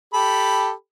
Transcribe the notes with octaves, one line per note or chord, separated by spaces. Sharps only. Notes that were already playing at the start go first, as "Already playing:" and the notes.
G4 A4 B5